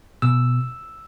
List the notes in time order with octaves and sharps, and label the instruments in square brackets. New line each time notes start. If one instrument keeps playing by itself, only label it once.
[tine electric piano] B2 E6